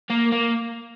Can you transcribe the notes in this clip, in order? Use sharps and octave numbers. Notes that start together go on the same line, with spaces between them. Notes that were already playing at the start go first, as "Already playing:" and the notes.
A#3
A#3